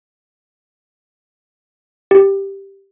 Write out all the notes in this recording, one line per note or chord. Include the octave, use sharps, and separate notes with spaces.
G4